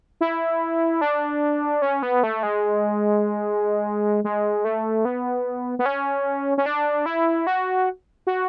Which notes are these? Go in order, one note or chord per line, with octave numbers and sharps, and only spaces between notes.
E4
D4
C#4
B3
A3
G#3
G#3
A3
B3
B3
C#4
C#4
D4
E4
F#4
F#4